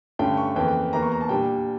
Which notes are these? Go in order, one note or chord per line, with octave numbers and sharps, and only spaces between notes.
G2 D3 A3 C#4 G5
C#6
F2 C#3 E3 A#3 G5
G5
E2 E3 A#3 A#5
C#6
A#5
A5
A#2 G3 D4 G5